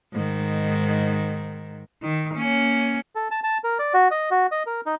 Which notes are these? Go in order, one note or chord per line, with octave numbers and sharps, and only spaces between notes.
G#2 D#3
D#3
A#3 C#4
A4
A5
A5
A#4
D5
F#4
D#5
F#4
D#5
A#4
D#4